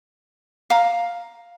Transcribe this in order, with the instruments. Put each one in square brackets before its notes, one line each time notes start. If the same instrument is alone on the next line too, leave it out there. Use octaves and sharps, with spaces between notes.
[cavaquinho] F5 A#5